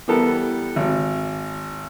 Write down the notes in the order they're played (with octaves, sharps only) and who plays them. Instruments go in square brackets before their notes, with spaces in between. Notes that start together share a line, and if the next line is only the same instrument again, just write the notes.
[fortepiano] E3 G3 B3 A4 A#4
G#1